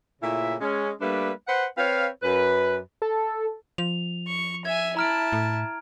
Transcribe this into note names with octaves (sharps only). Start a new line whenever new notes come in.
A#2 C#3 A3 E4 E5
G#3 C#4
G3 A3 A#3 D4 B4
B4 C5 F#5
C4 B4 C#5 F5
F#2 B4
A4
F3 F7
C#6
E5 G#5 G#6
E4 A5 A#5 F6 D7
A2